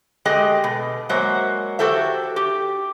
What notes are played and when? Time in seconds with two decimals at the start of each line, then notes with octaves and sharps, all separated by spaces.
0.25 G#3 A3 G4 G#4 D#5
0.64 B2
1.09 F#3 G#3 A#3 C5 E5
1.79 F#4 G4 A4 C5 E5
2.36 G4